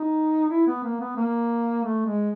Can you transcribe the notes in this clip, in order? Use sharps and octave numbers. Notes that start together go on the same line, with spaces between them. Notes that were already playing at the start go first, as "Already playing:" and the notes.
Already playing: D#4
E4
B3
A#3
B3
A#3
A3
G#3